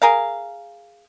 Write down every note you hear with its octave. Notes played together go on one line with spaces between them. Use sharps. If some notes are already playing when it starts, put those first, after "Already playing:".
G#4 A#4 F5